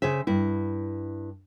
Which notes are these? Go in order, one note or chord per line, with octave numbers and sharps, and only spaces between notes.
C#3 G#4 C5 E5
G2 E4